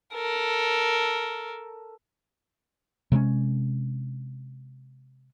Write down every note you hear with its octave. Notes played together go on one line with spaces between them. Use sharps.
A4 A#4
C3 G#3 B3 C#4